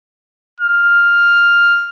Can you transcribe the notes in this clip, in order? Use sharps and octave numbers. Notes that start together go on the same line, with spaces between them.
F6